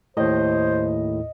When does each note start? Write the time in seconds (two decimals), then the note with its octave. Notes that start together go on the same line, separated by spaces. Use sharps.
0.17 D#2 A2 C5 D#5